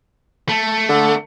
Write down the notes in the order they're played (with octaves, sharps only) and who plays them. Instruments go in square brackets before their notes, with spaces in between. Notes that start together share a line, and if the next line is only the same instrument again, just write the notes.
[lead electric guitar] A3
[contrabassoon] D3